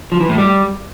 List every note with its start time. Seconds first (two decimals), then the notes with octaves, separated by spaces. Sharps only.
0.12 F3
0.21 E3
0.29 A2
0.38 G3